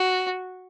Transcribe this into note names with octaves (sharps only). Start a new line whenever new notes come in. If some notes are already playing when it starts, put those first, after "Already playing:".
Already playing: F#4